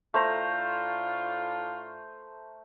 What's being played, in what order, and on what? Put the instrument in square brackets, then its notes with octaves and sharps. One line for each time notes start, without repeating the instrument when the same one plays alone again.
[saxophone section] A2 D4 F4 [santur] A3 C5 A#5